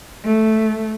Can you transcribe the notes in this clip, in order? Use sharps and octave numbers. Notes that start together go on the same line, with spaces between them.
A3